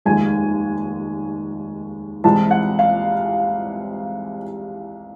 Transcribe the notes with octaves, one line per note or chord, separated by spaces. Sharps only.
F1 D#2 D#3 G#3 G#5
C2 C3 E3 G#3 A5
F#5
F5